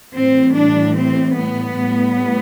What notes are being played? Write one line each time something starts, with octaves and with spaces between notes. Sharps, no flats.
A2 E3 G3 C4
D4
C4
B3
A2 G3